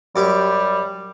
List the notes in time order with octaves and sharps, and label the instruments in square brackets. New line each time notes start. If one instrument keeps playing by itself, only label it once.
[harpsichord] F#2 G4 [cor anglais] G3